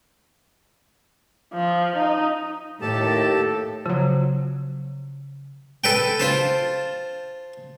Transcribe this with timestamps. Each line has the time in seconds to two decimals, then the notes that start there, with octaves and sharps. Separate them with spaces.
1.54 F3
1.97 D#4
2.82 D#2 A2 G4 A4 A5
3.86 C#3 F3 F#3
5.84 A4 B4 G5
6.19 F4 C5 A5